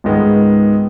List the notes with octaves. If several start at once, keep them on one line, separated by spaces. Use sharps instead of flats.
C#2 G#2 D#3 G#3 B3